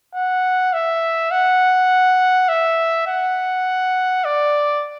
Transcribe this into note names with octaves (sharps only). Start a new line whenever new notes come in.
F#5
E5
F#5
E5
F#5
D5